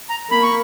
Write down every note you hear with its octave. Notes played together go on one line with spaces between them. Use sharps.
A#5
A#3 B5
C#6